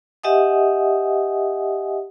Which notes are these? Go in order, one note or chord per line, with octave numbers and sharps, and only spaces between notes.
G4 D#5 E5 F#5 G#5 D#6